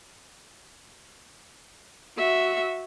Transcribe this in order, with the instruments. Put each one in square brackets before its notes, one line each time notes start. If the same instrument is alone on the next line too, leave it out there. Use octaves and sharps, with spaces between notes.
[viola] F#4 E5